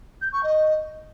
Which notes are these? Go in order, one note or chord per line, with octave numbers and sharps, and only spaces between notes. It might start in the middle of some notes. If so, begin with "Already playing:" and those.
G6
C#6
D#5